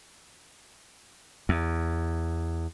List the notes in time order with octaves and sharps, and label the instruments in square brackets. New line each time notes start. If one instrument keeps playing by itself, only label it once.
[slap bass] E2